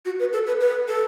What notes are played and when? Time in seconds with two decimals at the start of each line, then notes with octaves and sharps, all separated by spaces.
0.05 F#4
0.19 B4
0.33 A4
0.47 B4
0.60 B4
0.88 A4